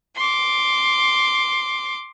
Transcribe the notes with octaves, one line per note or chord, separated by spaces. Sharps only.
C6 D6